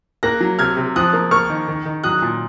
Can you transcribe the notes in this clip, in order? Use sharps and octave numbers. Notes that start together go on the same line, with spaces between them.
A#3 F#6 A#6
F#3
C3 F6 G#6
C3
F3 D#6 F#6
A#3
A#3 C#6 F6
D#3
D#3
D#3
F#3 D#6 F#6
A#2